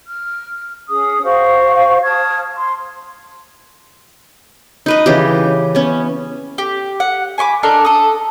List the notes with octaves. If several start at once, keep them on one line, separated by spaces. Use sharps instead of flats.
F6
C#4 G#4 D#6
F#4 C5 F5 C#6
A5 D#6 F6 G#6
C6
D#4 B4 D#5
C#3 E3 G4
B3 C#4
G4
F#5
G#5 B5 C#6 D6
D4 D#4 A4 A#4
A4 D#6